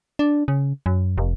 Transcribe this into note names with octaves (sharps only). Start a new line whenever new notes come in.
D4
C#3
F#2
F1